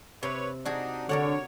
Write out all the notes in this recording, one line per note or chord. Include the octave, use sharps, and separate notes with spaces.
C3 B4 C#5
D4 D#4 F#4 G#4
D3 A#4 C#5 D5 F#5